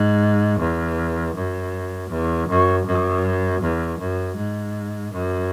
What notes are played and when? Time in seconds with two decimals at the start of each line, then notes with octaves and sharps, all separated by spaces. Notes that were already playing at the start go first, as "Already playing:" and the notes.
Already playing: G#2
0.59 E2
1.35 F#2
2.11 E2
2.48 F#2
2.86 F#2
3.62 E2
3.99 F#2
4.37 G#2
5.13 F#2